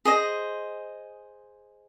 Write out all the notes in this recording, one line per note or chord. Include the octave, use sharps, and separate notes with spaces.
G#4 C5 D#5